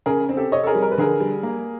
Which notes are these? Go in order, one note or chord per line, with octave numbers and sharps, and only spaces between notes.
C#3 G#4 A#4
C4
G4 A4
C3 C#5 D#5
A4
G#4 A#4
G3
A#4
B4
D3 G#4 A#4
G3
A#3